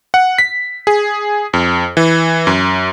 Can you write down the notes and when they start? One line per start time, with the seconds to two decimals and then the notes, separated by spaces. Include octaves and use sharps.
0.14 F#5
0.38 B6
0.87 G#4
1.53 F2
1.97 E3
2.47 F#2